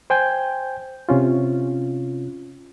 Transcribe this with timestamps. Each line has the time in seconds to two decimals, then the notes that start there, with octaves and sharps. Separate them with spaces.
0.10 C5 G5 G#5 G6
1.09 C3 C#4 F4